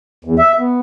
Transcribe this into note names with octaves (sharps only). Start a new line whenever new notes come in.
E2
E5
B3